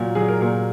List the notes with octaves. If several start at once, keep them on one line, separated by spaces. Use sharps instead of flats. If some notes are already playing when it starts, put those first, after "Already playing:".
Already playing: A#2 F#3
F#3 G#4
A#4
A#2 A#4